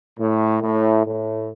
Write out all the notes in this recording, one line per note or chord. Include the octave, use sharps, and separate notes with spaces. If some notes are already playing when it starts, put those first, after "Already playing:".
A2
A2
A2